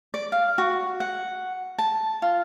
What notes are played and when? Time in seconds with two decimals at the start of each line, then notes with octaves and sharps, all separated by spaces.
0.14 D5
0.32 F5
0.58 F#4
1.00 F#5
1.79 A5
2.22 F4